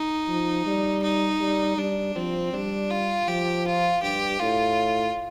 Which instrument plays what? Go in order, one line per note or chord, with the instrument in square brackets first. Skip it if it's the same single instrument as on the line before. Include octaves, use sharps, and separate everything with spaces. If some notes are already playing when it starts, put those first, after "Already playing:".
Already playing: [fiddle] D#4
[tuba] F3
G3
[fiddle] D#4
[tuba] G3
[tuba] G3 [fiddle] D4
[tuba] F3 [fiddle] C4
[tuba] G3 [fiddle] D4
[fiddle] F4
[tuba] F3 [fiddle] G4
[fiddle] F4
[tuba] G2 [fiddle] G4
[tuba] A2 [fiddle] F4